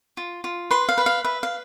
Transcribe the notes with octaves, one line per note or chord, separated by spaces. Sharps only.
F4
F4
B4 C6
F5
B4
F5
B4 E5
F5